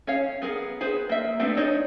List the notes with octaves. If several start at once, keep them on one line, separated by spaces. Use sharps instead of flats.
C#4 C#5 F5
B3 G#4 A#4
G#4 B4 C5
A#3 E5
A3 B3 C4 D4 F#4
D4 D#4 C#5 D#5